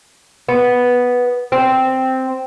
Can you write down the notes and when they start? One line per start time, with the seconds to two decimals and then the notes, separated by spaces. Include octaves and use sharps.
0.49 B3
1.52 C4